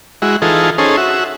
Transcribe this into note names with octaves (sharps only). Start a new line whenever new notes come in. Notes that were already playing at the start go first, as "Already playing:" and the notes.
G#3 E4 F#4
E3 D#4 F4 G#4 A4
C#4 D#4 G#4 A4 C5
F#4 E5